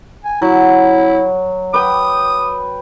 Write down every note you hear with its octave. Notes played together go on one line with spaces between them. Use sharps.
G#5
F#3 E4
B4 G5 D#6